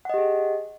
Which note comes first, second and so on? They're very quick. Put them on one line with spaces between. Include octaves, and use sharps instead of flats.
F#5 D#5 G4 G#4